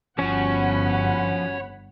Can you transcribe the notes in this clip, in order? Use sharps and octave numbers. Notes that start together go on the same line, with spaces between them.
G1 F3 C#4 F#4 C#5 F#5 G#5 B5